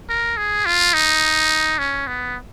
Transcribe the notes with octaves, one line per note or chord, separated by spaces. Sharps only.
A#4
G#4
F4
D#4
C#4
B3